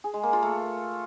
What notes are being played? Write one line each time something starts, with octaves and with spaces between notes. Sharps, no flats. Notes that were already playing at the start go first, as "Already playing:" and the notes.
G#4
G#3
A#3
F4
A3